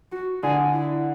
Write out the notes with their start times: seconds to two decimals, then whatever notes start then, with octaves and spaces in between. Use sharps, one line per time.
0.12 F#4
0.43 D3 G#4
0.74 E4